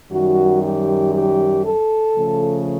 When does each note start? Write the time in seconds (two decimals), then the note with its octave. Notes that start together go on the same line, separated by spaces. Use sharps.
0.11 F#2 D#3 G3 F#4
0.63 G4
1.15 G4
1.65 A4
2.17 C#3 F3 A3